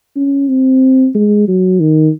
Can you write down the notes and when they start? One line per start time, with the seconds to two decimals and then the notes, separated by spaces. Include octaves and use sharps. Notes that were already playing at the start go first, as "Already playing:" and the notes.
0.16 C#4
0.49 C4
1.15 G#3
1.48 F#3
1.80 D#3